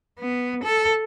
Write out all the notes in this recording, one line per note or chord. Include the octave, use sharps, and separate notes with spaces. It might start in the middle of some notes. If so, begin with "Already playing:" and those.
B3
A4